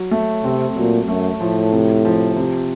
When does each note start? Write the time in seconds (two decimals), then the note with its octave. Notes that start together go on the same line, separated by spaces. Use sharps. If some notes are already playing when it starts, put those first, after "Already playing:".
Already playing: F#3
0.11 A3
0.44 C3 C4
0.76 A#2 F#3
1.08 F#2 A3
1.40 A2 F3
1.72 C3
2.05 F3
2.36 C3